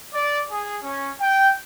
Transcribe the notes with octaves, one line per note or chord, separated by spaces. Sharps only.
D5
G#4
C#4
G5